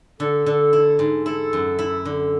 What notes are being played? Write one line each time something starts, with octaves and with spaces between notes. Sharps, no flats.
D3 A4
D3
E4
G#2
E4 A4
F#2
E4
D3